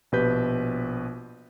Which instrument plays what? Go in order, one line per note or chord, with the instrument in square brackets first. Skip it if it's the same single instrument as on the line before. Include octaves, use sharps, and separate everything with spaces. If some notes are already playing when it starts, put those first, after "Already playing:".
[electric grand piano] A#1 B2 G4 B4 G6 B6